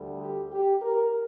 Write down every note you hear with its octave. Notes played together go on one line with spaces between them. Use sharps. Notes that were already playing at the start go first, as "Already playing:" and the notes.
Already playing: D2 D3 G3
G4
G4
A#4